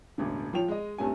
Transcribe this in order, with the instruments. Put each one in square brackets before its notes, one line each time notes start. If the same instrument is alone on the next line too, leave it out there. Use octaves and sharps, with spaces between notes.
[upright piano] E1 A1 D3
F3 F4 C#5 G5 F7
G#3 D#5
C2 G2 A3 C#4 G#5